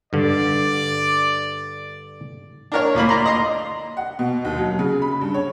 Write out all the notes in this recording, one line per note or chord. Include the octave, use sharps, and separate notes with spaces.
G2 D3 D5
D4 A#4 C#5
D2 A#2 A#3 B5
D5 A#5 C6
D#5 A#5 C6 D#6
F#5
B2
D#2
F#3
C#3
B5
G2
C#5